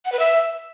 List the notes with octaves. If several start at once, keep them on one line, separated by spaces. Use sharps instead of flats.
F#5
B4
E5